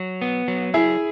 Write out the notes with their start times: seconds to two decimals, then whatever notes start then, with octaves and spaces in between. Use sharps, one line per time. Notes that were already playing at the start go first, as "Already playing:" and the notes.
Already playing: F#3
0.21 B3
0.48 F#3
0.74 E4 G#4